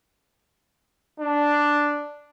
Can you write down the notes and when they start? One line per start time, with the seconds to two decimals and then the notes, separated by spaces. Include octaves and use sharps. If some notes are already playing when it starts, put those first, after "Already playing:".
1.20 D4